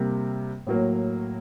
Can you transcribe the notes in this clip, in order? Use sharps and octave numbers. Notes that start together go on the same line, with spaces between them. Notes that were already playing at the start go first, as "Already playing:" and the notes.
Already playing: C3 G3 A#3
A2 F#3 A#3